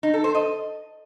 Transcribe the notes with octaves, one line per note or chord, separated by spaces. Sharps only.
D#4
A4
C5
D#5